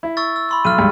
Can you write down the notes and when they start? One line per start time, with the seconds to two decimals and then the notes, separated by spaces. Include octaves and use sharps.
0.03 E4
0.17 C#6 E6 A6
0.36 E6
0.49 B5 C6 E6
0.65 B1 F6 D#7
0.78 C#2 G2